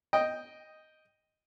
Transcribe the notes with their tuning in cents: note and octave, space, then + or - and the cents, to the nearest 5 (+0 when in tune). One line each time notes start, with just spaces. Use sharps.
D#5 +0 G5 +0